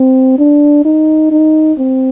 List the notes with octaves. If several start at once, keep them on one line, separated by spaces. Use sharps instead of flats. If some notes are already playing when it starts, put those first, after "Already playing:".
Already playing: C4
D4
D#4
D#4
C4